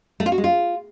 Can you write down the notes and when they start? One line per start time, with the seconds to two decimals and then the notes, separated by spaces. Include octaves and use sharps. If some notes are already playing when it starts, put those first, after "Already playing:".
0.20 A3
0.26 F4
0.32 F#4
0.38 G#3
0.44 F4